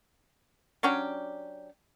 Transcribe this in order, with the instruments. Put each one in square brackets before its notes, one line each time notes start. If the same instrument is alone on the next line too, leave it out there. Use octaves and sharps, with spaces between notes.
[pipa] F#3 C#4 D4 G4